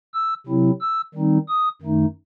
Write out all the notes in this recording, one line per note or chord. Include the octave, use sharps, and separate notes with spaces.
E6
C3 F#3 C4 E4
E6
D#3 G3 C4 D#4
D#6
F#2 D#3 A3 D#4